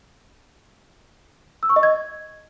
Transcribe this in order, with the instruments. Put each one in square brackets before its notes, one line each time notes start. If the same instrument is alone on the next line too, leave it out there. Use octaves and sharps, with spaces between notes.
[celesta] E6
C#6
D#5
G#6